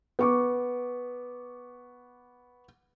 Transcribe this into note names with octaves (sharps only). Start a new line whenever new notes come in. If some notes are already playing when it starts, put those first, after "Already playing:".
B3 C#6 D6